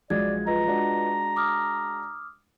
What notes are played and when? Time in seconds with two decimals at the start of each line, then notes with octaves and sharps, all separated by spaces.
0.10 A#1 F#3 G#3 D5 G#6
0.47 F4 B4 D#5 A#5
0.67 G#3 D4 F#4
1.36 D6 D#6 F6